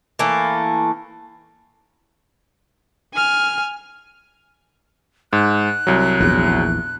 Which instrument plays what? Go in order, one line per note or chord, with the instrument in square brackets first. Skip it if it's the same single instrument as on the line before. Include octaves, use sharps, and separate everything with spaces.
[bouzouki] E3 A3 A#3
[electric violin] G#5 F6
[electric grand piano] G#2 [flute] F#6
[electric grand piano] C2 F#3
[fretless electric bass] A#1 E2